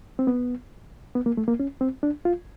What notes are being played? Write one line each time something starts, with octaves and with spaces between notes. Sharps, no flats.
C4
B3
B3
A#3
A3
A#3
C#4
C4
D4
F4